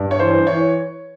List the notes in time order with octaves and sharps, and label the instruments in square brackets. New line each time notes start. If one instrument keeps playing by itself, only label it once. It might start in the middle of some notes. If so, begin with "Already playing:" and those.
Already playing: [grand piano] G2
C#5
E3 C5
E3 C#5